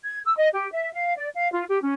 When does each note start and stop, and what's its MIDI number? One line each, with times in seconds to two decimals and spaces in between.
0.03 0.18 92
0.25 0.35 88
0.37 0.48 75
0.53 0.71 67
0.72 0.91 76
0.93 1.15 77
1.16 1.28 74
1.35 1.51 77
1.53 1.63 65
1.68 1.78 67
1.83 1.93 61